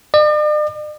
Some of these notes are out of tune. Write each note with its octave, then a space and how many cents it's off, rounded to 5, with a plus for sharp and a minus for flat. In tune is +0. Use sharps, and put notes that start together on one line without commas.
D5 +45